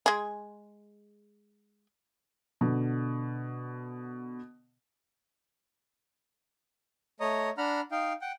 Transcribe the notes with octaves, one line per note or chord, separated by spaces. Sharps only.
G#3 G#4
B2 D3
A3 C#5 D#5 A#5 D#6
D4 F#5 A#5 B5 F6
D#4 F5 G5
F#5 G5